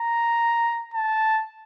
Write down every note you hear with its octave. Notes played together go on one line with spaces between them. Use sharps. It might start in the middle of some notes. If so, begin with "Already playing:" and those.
Already playing: A#5
A5